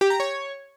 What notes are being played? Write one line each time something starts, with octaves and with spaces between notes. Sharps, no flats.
G4
A#5
C#5